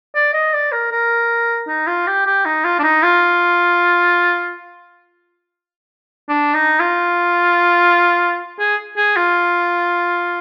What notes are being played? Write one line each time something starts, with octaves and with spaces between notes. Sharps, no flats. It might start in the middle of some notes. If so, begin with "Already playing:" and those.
D5
D#5
D5
A#4
A#4
D#4
F4
G4
G4
D#4
F4
D4
D#4
F4
D4
D#4
F4
G#4
G#4
F4